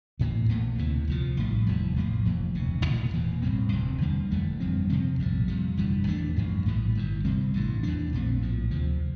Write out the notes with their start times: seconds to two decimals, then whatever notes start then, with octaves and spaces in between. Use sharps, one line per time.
0.19 A1 A2 E3 A#3
0.49 A#1 A#2 A3
0.78 D2 C3 E3
1.08 C2 A#2 F3
1.37 A#1 A2 G3
1.67 F1 E2 E3 G3
1.96 A#1 A2 F3 A#3
2.25 F1 F2 E3
2.55 E1 D2 C3
2.85 A1 A2 E3 A3
3.13 E1 E2 E3 A#3
3.42 A1 A2 G3 C4
3.72 E1 D2 C3
4.01 E2 D3 G3 A#3
4.31 F1 F2 E3 A3
4.60 G1 G2 F3 C4
4.90 F2 C3 F3 C4
5.19 A#1 A2 E3 G3
5.48 F2 C3 G3
5.77 G1 G2 E3 G3
6.07 E2 E3 A3 D4
6.36 A1 G2 F3 A#3
6.66 A#1 A2 E3 G3
6.95 G1 G2 E3
7.25 E2 C3 G3 C4
7.54 A1 G2 E3
7.83 E2 E3 A#3 D4
8.13 A#1 A#2 A3 C4
8.42 A#1 A2 F3
8.71 D2 C3 F3